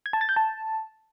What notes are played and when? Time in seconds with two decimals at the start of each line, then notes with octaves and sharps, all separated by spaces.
0.06 G#6
0.13 A5
0.21 A6
0.29 G6
0.36 A5